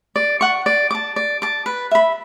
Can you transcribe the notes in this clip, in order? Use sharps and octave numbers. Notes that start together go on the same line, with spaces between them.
D5
F#5 C#6
D5
A5 D6
D5
A5 D6
B4
E5 B5